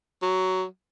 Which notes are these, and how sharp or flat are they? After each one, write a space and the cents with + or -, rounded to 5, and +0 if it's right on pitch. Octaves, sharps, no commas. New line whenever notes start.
F#3 +10